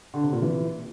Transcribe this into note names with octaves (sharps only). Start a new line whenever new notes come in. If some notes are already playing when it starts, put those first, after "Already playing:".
D3
C3
A#2
E3